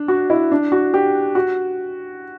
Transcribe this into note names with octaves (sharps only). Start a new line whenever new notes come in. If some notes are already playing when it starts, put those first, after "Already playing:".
Already playing: D4
F#4
E4
D4
F#4
G4
F#4